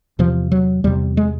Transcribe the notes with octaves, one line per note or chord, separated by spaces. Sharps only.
E2 C3 F3
F#3
E2 C3 G3
G#3